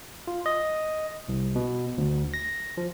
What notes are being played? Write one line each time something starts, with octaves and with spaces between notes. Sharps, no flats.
F4
D#5
C2
B2
D2
A#6
F3